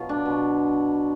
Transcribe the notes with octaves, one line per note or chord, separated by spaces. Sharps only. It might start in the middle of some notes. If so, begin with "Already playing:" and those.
Already playing: B2 F#3 F4
D4
B2 F#3